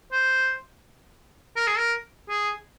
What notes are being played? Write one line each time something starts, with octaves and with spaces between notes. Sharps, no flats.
C5
A#4
G#4
A#4
G#4